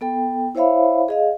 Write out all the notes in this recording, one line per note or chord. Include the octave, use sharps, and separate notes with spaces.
B3 A4 G5
E4 C5 C#5 E5 F5 B5
G#4 D#5 F5